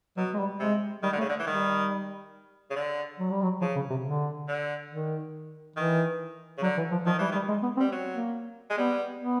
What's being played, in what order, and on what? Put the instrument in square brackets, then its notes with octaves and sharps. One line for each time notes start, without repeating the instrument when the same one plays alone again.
[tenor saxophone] B2 [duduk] F#3
[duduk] G#3
G3
[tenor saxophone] C3 [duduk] G#3
[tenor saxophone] D#3 [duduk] G3
[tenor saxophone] D3
[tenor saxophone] C#3 [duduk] A3
[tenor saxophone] D3
E3
[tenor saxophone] D#3 [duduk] G3
[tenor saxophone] C#3
D3
[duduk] F#3
G3
F#3
[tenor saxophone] C#3 [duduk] F3
[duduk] C#3
C3
D3
[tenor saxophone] D3
[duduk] D#3
[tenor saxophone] D#3 [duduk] E3
[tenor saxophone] C#3
[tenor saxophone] D3 [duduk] F#3
[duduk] E3
F3
[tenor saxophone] D#3 [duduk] F3
[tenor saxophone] E3 [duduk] G3
[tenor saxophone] D#3
[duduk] G3
G#3
B3
C4
[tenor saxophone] G3
F#3
[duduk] A#3
[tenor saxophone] G#3
[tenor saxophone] G3 [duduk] B3
[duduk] B3